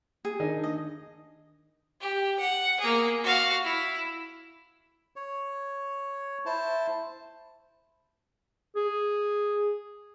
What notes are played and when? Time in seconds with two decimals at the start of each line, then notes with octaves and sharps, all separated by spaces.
0.25 G#4
0.40 D#3 D4 D#4
0.64 D#5
2.01 G4
2.40 F#5
2.80 A#3 G#4
3.23 F#4 F5
3.64 E4
5.16 C#5
6.46 E4 C5 A5
8.76 G#4